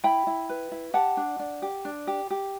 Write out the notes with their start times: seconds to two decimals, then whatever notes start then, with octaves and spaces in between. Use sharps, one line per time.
0.04 E4 G5 B5
0.27 E4
0.49 B4
0.72 E4
0.94 G4 F#5 A5
1.17 D4
1.39 D4
1.62 G4
1.85 D4
2.07 G4
2.30 G4